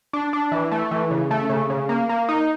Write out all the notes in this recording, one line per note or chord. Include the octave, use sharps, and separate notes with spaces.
D4
D4
E3
A3
E3
C#3
A3
C#3
C#3
A#3
A#3
D#4